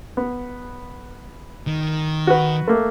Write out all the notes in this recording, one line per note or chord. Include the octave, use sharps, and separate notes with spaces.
B3
D#3
F#4 B4
A3 A#3